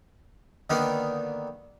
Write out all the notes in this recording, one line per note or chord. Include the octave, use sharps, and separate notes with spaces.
D3 D#3 A#3 B3 D#4